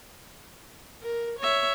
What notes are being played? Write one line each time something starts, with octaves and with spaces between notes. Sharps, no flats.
A#4
C#5 E5